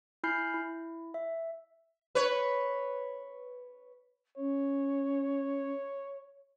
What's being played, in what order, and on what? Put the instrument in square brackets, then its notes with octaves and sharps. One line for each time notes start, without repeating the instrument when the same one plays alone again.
[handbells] E4 G#5 B5 F6 G6 C7
E4
E5
[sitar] B4 C#5
[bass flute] C#4 [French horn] C#5